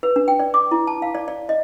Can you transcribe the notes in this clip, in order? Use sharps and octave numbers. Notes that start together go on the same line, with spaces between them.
B4
D4
G5
D5
D6
E4
A5
F5
D5
D5
D#5